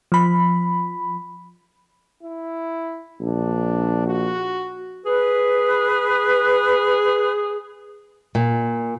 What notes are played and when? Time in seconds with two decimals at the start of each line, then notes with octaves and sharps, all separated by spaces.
0.12 F3 B5
2.23 E4
3.21 A#1 D4
4.07 F#4
5.05 G#4 B4
8.35 A#2